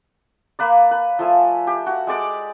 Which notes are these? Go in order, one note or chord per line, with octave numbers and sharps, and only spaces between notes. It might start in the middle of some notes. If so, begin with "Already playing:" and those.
A#3 B4 D5
B4
F3 A3 G#5
G4
F#4
G#3 G4 D5 D6